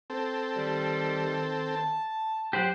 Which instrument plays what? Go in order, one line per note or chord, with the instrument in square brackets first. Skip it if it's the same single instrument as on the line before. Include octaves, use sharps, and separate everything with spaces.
[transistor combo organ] C4 A4
[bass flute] D#3 [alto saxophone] G3
[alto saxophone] A5
[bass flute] F#3 [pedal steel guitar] G4 C5 F#5